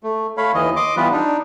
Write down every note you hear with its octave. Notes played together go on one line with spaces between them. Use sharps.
A3
A3 C#5 F5 B5
D#2 E3 D#5
D#5 C6 D6
E3 G3 B3 F4 B4
D4 D#4